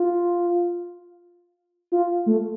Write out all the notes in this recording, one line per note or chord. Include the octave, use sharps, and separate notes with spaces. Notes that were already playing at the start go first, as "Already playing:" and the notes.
Already playing: F4
F4
A3